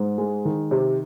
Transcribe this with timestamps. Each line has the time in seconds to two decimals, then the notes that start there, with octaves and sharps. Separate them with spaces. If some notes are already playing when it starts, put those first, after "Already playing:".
Already playing: G#2
0.18 G#3
0.45 D#3
0.71 C3